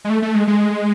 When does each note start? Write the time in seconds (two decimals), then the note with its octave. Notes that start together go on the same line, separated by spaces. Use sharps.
0.05 G#3
0.10 A3
0.22 A3
0.35 G#3
0.47 G#3